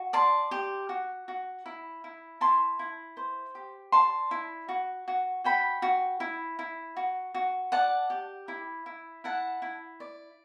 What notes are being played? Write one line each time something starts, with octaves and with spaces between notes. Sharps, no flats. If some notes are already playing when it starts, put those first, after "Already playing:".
Already playing: F#4
D5 A5 C6
G4
F#4
F#4
E4
E4
E4 A5 C6
E4
C5
G4
D5 A5 C6
E4
F#4
F#4
F#4 G5 B5
F#4
E4
E4
F#4
F#4
D5 F#5 A5
G4
E4
E4
E4 F#5 A5
E4
D5